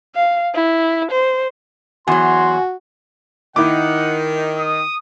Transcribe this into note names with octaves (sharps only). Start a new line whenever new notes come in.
F5
E4
C5
E2 F#3 F#4 G#5 C6
D#3 E4 F#5 D6
D#6